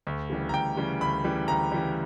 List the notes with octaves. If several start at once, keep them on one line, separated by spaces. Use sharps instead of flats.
D2
C#3 E3 G3
A#5
D2 G5
C#3 E3 G3
D2 B5
C#3 E3 G3
D2 A#5
C#3 E3 G3